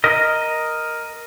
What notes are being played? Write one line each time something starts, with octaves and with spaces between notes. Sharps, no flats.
A#4 D#5